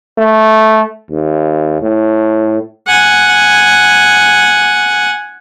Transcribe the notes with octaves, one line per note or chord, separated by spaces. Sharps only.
A3
D#2
A2
F#5 G#5